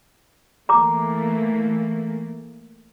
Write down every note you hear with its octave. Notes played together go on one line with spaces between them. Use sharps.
E3 A3 A#3 A#5 D6